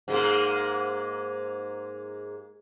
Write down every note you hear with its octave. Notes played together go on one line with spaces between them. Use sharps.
G#2 G#3 A#3